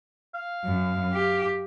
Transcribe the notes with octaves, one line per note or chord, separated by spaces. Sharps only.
F5
F#2
G4